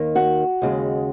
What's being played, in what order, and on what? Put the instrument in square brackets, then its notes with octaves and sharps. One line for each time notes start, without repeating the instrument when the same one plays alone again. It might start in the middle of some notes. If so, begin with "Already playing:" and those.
Already playing: [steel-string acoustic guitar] D#2 D#3 A#3
F#4 F#5
D#2 C#3 G#3